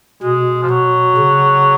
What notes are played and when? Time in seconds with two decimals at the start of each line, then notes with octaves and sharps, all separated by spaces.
0.22 B2 G#3
0.63 F3
0.70 B2 F#3
1.17 C#3